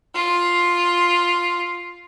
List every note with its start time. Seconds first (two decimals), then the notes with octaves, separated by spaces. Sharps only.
0.15 F4